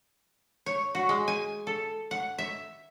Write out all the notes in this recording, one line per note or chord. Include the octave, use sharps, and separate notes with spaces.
C#5
F#4
G#3
G#5
A4
F#5
E5